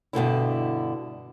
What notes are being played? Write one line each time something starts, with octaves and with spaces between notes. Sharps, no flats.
G2 B2 D3 E4